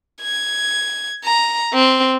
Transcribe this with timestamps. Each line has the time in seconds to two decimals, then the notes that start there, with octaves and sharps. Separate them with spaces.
0.22 G#6
1.25 A#5
1.73 C4